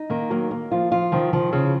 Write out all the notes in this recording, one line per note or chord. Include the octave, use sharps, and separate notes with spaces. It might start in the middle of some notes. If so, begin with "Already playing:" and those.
Already playing: D#4
D#3 A#3
F#3 A#3
A#3
F3 F4
F3 F4
D#3 F3
D#3 F3
C#3 F3